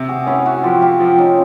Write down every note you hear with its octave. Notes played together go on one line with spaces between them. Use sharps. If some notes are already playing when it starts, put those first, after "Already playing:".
Already playing: C3
F#4 G#4
C#4 E4 F#4
E4 F#4
F3 F4 G4
F4 G4
F3
C#4 D#4